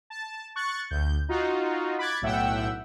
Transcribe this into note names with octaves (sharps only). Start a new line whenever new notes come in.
A5
C#6 F#6 A6 C#7
D2 G6
D#4 F4 F#4
B5 D6 F#6 G#6 A6
B1 A2 E5 F#5 G5 E6